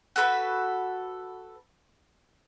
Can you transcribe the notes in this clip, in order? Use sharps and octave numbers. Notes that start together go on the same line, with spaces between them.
F#4 A4 B4 B5